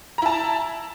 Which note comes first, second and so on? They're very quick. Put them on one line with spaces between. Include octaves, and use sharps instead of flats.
A#5 E4 A5